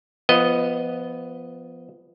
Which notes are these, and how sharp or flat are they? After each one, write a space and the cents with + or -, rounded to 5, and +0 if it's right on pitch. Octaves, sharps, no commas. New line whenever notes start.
F3 -20 B3 +0 D#5 +0